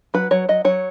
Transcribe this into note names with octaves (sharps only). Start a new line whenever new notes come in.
F#3 B4
F#3 C#5
F#3 D#5
F#3 C#5